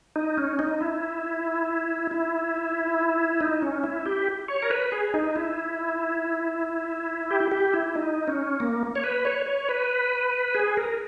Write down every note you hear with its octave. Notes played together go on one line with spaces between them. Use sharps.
D#4
C#4
D#4
E4
E4
D#4
C#4
E4
G4
C#5
A#4
B4
G#4
D#4
E4
G4
G4
E4
D#4
C#4
A#3
C#5
B4
C#5
C#5
B4
G#4
A#4